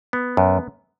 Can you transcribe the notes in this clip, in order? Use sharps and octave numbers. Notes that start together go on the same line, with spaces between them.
B3
F#2